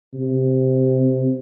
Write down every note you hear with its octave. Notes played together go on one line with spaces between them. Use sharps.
C3